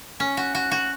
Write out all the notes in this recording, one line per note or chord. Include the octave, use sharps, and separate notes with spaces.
C#4
F#4
F#4
F#4